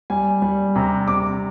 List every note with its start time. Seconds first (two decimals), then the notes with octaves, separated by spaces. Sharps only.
0.10 G3 G#5
0.42 G3
0.75 C3 A#5
1.08 C3 D6